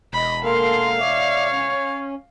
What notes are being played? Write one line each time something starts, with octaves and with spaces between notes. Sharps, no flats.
E1 D#5 B5
A#3 A4 A#4 F5 C6
C#5 D5 E5
C#4